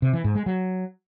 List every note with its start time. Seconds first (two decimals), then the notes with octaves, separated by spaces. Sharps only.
0.02 C3
0.13 E3
0.24 G#2
0.35 G#3
0.46 F#3